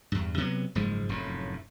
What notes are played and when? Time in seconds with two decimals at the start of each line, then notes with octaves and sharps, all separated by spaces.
0.12 E2 G2
0.38 C3 F#3 B3
0.75 F#1 G#2 F3 G#3
1.09 F1 F#2 A2